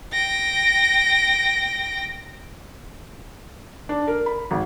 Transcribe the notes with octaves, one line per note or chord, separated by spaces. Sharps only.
G5 A#6
D4
A#4
B5
G#1